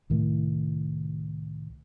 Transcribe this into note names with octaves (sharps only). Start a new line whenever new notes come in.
C2 A2 D#3 A3